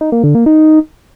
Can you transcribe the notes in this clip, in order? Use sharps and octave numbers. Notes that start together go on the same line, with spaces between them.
D#4
A#3
D3
A#3
D#4